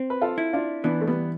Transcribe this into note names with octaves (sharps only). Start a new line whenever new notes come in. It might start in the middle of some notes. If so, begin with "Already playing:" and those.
Already playing: C4
B4
F4 A4
E4
D4 F4
E3 B3 D4
A3
G3 B3